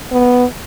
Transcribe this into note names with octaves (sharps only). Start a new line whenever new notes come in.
B3